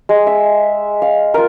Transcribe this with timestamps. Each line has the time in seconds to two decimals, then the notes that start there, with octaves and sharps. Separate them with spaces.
0.09 G#3
0.27 E5
1.02 F5
1.34 F4 A#4